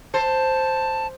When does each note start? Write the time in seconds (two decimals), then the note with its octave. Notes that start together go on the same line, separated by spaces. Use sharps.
0.14 C5 A5